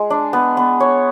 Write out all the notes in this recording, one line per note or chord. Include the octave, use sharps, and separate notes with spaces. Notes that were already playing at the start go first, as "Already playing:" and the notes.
Already playing: G#3
D4
B3
B3
C#5